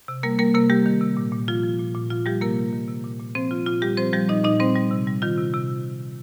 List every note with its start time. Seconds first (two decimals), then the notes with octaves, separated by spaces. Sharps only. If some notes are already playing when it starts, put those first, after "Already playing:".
0.08 C3
0.23 G3 A#3 A#4
0.39 G3 A#3 A#4
0.54 C3 A#3 A#4
0.70 G3 G4
0.86 D#3
1.01 C3
1.17 A#2
1.32 A#2
1.48 F3 F4
1.64 F3
1.79 A#2
1.94 A#2
2.10 F3 F4
2.26 F3 G3 G4
2.41 C3 A#3 A#4
2.57 G3
2.73 D#3
2.88 C3
3.04 A#2
3.19 A#2
3.35 F3 C4 C5
3.51 F3 F4
3.67 A#2 F4
3.82 A#2 G3 G4
3.97 F3 C4 C5
4.13 F3 G3 G4
4.29 A#2 D#4 D#5
4.44 A#2 D#4 D#5
4.59 G3 C4 C5
4.75 G3
4.91 C3
5.07 G3
5.22 D#3 F4
5.38 C3
5.54 C3